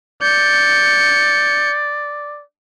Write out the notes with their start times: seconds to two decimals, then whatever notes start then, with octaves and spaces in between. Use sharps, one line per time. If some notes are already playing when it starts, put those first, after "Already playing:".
0.22 D5 G6 C#7